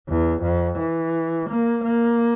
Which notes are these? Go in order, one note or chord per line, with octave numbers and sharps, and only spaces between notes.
E2
F2
E3
A#3
A#3